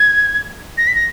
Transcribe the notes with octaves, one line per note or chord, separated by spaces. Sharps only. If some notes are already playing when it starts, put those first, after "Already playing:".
Already playing: G#6
A#6
B6
A#6